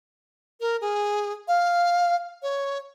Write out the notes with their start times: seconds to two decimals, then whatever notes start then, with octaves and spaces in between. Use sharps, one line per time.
0.61 A#4
0.81 G#4
1.48 F5
2.42 C#5